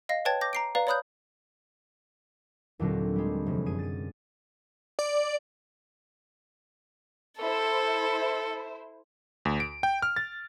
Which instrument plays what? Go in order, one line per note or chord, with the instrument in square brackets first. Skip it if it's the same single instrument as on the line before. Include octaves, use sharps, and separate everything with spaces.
[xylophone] D#5 F5 A#6
B4 C#5 G5 A5 G#6 A6
D6 G6 A#6
A#5 C7 D7
B4 D5 F5 A#5
C#5 D5 B5 D#6 F#6 G6
[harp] D#2 A#2 D3 F#3 C4 D4
G3 G#3
F1
F#2 G#4 D#7
A6 D#7
[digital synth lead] D5
[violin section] E4 C5 [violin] A4
[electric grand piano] D2
D7
G5
F6
A6